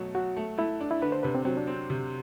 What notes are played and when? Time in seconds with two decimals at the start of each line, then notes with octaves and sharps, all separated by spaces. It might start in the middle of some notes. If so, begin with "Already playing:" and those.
Already playing: B2 F#3 A3
0.15 F#3 F#4
0.36 A3
0.58 A3 E4
0.80 D4
0.91 E4
1.02 D3 B4
1.12 C5
1.23 C3 B4
1.35 C4
1.45 F#3 C4
1.57 D4
1.67 C4
1.90 C3